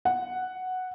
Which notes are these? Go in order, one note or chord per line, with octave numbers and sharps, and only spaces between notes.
F#5